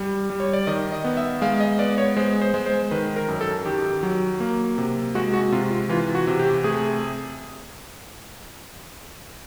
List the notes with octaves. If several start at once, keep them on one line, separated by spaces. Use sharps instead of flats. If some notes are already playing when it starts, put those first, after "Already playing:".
Already playing: G3
G3
C#5
D5
D#3 D#5
D#5
B3
E5
G#3 F5
D#5
B3 D5
C#5
G#3 C5
C5
G#3
C5
D#3 B4
A#4
F#2
A4
D#3 G4
F#3
A#3
C3
G#3 F#4
F#4
C3 F4
F4
E3 F4
F#4
C3
G4
A3 G#4